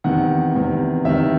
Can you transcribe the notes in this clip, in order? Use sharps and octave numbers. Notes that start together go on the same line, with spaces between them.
E2 C3 D#3 F#5
E2 C3 D#3
E2 C3 D#3 E5